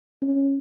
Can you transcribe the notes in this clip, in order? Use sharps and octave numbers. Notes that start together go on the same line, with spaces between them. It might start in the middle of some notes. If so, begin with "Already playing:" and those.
C#4